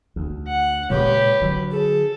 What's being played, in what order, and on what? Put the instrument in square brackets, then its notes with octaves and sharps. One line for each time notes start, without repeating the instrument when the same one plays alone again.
[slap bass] D2
[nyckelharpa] F#5
[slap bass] A#2 C#3 G#3 [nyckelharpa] G4 B4 [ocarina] C#5
[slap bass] D3 F#3
[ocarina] G#4 [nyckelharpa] A4